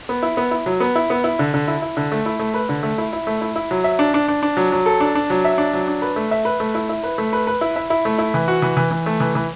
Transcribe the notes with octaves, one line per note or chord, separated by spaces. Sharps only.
B3
E4
B3
E4
F#3
B3
E4
B3
E4
D3
D3
E4
E4
D3
A3
E4
A3
B4
D3
A3
E4
E4
A3
E4
E4
F#3
E5
D4
D4
D4
D4
F#3
F#3
A4
D4
D4
F#3
E5
D4
F#3
D4
B4
A3
E5
B4
A3
E4
E4
B4
A3
B4
B4
E4
E5
E4
A3
E4
E3
F#4
E3
E3
E3
A3
E3
E3